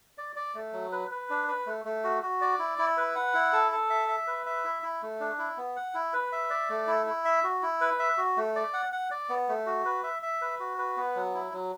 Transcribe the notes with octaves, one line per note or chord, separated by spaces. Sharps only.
D5
D5
A3
F#3
B4
B4
D4
B4
A3
A3
F#4
F#4
D5
E4
E4
B4
F#5
E4
A4
A4
E5
E5
B4
E5
E4
E4
A3
D4
E4
B3
F#5
E4
B4
E5
D5
A3
E4
E4
E5
F#4
E4
B4
E5
F#4
A3
D5
F#5
F#5
D5
B3
A3
F#4
B4
E5
E5
B4
F#4
B4
B3
F#3
E4
F#3